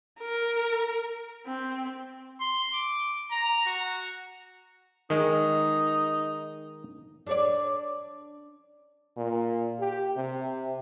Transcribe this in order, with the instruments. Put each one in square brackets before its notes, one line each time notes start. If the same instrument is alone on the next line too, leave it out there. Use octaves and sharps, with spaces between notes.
[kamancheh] A#4
C4
[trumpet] C6
D6
A#5
F#4
[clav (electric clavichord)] D#3 G#3 [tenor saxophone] D#4
[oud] D4 C#5 D5
[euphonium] A#2
G4
C3